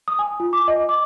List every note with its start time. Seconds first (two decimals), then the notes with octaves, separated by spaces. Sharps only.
0.08 D#6
0.19 G#5
0.40 F4
0.53 D6
0.68 D#5
0.89 D6